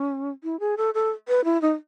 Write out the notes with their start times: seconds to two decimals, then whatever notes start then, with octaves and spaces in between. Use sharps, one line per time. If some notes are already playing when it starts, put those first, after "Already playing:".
Already playing: C#4
0.43 E4
0.60 G#4
0.77 A4
0.94 A4
1.28 B4
1.44 E4
1.62 D#4